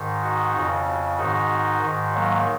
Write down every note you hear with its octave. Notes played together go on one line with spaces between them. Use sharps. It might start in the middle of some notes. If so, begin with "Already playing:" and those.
Already playing: G#2 D#3
D#4 F#4
F2 C#3
G#2 D#3 D#4 F#4
G#2 D#3
F#3 A#3